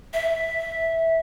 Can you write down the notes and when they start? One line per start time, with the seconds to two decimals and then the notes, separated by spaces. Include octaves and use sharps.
0.13 E5